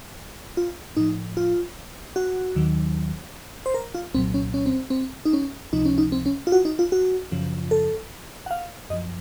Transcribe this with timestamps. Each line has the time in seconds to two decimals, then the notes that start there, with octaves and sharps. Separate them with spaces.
0.57 F4
0.97 A2 F3 D#4
1.37 F4
2.16 F#4
2.56 D#2 D#3 F#3
3.66 C5
3.74 A#4
3.95 F4
4.14 C2 A#2 F#3 C4
4.34 C#4
4.54 C#4
4.66 C4
4.90 C4
5.25 D#4
5.33 C#4
5.73 C#2 C3 F3 D#4
5.85 C#4
5.98 D#4
6.12 C4
6.26 C#4
6.47 F4
6.52 F#4
6.65 D#4
6.79 F4
6.92 F#4
7.32 F#2 C#3 F3
7.71 A4
8.46 F#5
8.51 F5
8.90 F#2 D#5
8.93 F3